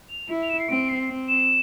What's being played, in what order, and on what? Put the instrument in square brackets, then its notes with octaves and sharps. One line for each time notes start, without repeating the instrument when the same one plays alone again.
[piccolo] F7
[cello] E4
[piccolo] F7
E7
C7
[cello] C4 [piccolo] D7
[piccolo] C7
[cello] C4
[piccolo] E7